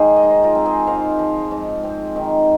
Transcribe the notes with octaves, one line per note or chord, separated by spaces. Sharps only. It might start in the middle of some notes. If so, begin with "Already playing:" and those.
Already playing: G#2 D#3 G#4 C5 F5
D#5
D#4
C5
F4 A#4
C4
G#4 C5
G#2 C5 F5
F3
G#2
C4
D#3